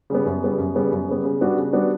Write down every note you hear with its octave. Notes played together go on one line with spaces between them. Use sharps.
C#3 G3 B3
F#2
C#3 G3 B3
F#2
C#3 G3 B3
F#2
C#3 G3 B3
C#3
G3 B3 D4 F#4
C#3
G3 B3 D4 F#4